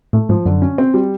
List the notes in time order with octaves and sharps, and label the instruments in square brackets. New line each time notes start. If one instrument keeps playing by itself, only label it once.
[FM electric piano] A2 [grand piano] A3
[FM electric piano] G#2 [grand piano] F3
[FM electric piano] F#2 [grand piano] D3
[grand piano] C#4
C4
G3